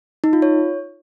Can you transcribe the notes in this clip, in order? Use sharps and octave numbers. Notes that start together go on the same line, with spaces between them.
D#4
F4
C#5